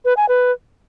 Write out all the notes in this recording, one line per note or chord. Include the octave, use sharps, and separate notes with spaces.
B4
G#5
B4